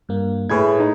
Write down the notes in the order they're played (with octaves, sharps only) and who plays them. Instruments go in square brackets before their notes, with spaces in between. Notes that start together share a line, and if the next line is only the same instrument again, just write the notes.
[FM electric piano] G2 A#3
[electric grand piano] A2 B5 G#6 [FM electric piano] E4 G#4 B4
[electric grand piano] D#4